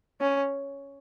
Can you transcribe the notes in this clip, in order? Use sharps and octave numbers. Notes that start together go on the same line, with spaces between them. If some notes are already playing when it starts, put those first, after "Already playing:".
C#4